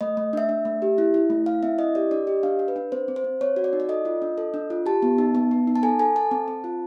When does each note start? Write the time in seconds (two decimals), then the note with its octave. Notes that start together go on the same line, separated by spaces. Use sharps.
0.01 A3 D#5
0.17 A3
0.33 D4 E5
0.49 D4
0.65 A3
0.82 G4
0.98 E4
1.14 E4
1.30 A3
1.46 E4 F5
1.63 C4 E5
1.78 E4 D#5
1.95 G4 D5
2.11 D4 D5
2.27 G4 D#5
2.43 D4 F5
2.59 D4
2.68 B4
2.76 D4
2.92 C4 C5
3.08 C4
3.16 C5
3.24 C4
3.41 C4 C#5
3.56 F#4
3.64 D5
3.73 D#4
3.80 D5
3.89 A4 D#5
4.05 F4
4.22 D4
4.38 A4
4.54 D4
4.70 F4
4.86 G4 A5
5.02 B3
5.18 D#4
5.35 B3
5.51 B3
5.67 D#4
5.76 A5
5.83 A4 G#5
5.99 A4 G#5
6.16 A4 A5
6.31 C4
6.48 C4
6.64 F4